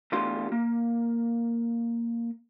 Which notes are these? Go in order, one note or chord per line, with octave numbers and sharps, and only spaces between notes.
E2 A3 D4 F4 G4 C6
A#3